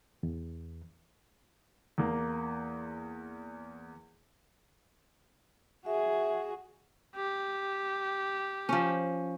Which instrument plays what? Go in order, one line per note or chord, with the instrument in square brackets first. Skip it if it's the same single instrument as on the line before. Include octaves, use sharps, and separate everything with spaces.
[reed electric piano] E2
[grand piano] E2 A#3
[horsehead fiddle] F#4 G#4 [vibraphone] E5
[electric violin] G4
[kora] F3 C#4